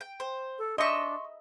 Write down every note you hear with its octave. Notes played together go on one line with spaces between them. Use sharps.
G5
C5
A4
D4 D#5 E5 C6 C#6